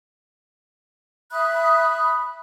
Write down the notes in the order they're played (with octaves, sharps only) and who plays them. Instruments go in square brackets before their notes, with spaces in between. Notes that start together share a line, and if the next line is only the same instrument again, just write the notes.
[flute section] E5 B5 D#6 F#6